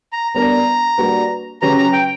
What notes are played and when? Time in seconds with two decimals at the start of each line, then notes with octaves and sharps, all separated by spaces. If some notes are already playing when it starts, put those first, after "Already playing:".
0.13 A#5
0.34 G3 B3 D4 A#4 A#5
0.98 G3 A#3 D4 F#4 B4
1.62 C#3 F#3 C#4 G4 B4 A#5
1.78 A#5
1.93 G5